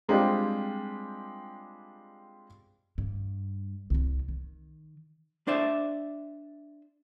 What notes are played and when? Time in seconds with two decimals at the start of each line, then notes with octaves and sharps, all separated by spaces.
0.08 G3 G#3 C4 D4 F4 G4
2.98 G2
3.90 C2 C3
4.28 D#3
5.47 D4 C5 D5 E5